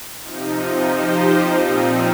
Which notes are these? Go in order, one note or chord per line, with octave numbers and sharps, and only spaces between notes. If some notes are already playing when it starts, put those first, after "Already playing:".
C3 F3 D#4
F3 D#4 G4 C5
A#2 F3 C4 D#4